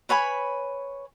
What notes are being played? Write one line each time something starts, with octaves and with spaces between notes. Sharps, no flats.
B4 C#5 G#5 B5